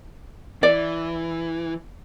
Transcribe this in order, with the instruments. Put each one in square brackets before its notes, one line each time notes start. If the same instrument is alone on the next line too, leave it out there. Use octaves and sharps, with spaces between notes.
[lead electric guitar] E3 [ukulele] D5